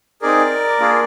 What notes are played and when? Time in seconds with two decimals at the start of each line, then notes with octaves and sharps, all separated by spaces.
0.22 C4 D#4 G#4 A#4 D5
0.80 A#3 D4 F4 G#4